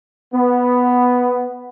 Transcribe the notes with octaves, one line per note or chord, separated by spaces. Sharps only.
B3